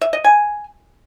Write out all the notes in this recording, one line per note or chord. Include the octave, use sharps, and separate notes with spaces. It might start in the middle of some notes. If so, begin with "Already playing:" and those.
E5
D#5
G#5